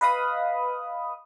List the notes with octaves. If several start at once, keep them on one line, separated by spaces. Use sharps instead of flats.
B4 D#5 F5 B5 D#6